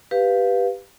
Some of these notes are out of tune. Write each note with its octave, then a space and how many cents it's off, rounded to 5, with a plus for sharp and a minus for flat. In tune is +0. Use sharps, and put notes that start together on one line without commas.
G4 +0 B4 +0 F5 +0